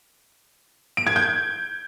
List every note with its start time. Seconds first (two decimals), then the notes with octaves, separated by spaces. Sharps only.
0.97 D7
1.07 G#6
1.16 G6